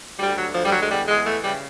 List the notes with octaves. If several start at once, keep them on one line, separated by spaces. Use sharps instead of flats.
D2 G3
D3 F#3
D2 F3
G3
D3 F#3
G#3
E2 G3
E2 G#3
E3 A3
C#3 G3